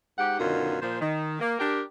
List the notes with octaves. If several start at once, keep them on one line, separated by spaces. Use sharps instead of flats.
G#2 G4 F#5
F#2 B2 D3 D#3 D#4 F4
A#2 F3 C5
D#3
A#3
D4 G4 A#4